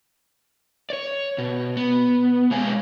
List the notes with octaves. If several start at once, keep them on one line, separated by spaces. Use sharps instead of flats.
C#5 D5
B2
B3
B2 G#3 C#5 F5 G#5